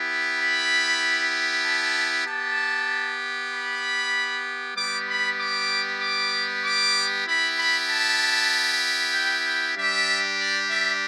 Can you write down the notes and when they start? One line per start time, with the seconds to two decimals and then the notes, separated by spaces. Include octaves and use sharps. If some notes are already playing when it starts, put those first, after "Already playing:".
Already playing: B3 E4 G4
0.40 B5
1.64 A5
2.26 B3 G4 A5
3.52 B5
4.76 G3 B3 G4 D6
5.08 B5
5.39 D6
6.01 D6
6.64 D6
7.26 B3 E4 G4 B5
7.58 B5
7.88 A5
9.13 G5
9.44 G5
9.76 G3 D4 G4 E5
10.39 D5
10.69 E5